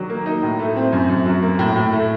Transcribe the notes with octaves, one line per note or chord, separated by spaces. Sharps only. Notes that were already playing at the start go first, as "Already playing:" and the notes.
Already playing: D#3 F#3 D4
A#3
D#4
A2
A3
C4
F#2
F#2
F#3
A#3
A2
A2
A3